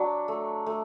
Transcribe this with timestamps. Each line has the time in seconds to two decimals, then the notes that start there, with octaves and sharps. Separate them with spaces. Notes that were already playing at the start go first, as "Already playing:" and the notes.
Already playing: F#3 D4 D5
0.28 A3
0.66 A3